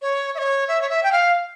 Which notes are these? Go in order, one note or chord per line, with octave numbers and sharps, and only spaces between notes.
C#5
E5
C#5
E5
C#5
E5
G5
F5